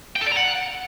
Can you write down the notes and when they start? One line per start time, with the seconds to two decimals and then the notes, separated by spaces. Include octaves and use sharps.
0.16 G5
0.21 A4
0.27 D5
0.32 A#5
0.37 F#5